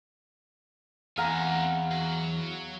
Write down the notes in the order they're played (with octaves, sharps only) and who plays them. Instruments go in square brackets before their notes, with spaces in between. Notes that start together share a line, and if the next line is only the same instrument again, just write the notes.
[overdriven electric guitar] E2 [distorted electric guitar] C4 G#5 [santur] F5 F#5 A#5
[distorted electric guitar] F#3